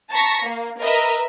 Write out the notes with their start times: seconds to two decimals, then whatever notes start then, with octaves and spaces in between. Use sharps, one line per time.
0.11 A5 A#5 C#6 A#6 B6
0.45 A#3
0.81 A#4 B4 D#5 E5 A#5